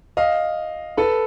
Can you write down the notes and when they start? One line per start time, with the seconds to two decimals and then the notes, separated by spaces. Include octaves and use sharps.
0.17 D#5 F5
0.97 A4 B4